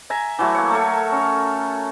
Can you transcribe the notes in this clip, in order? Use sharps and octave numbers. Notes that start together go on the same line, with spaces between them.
E5 G#5 A#5
E3 F#3 A3
A#3 C#5
A3 A4 A#4 C#5
C#4 C#5